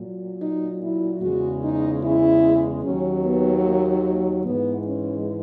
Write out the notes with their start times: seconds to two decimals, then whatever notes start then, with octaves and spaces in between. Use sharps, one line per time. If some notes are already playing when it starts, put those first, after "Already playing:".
Already playing: A#2 F#3
0.41 D#4
0.82 E4
1.22 E2 C#3 G#3 F#4
1.62 D#4
2.03 E4
2.84 D#2 D#3 F#3 C#4
3.24 B3
3.64 A#3
4.45 G#2 E3 G#3 B3
4.86 C#4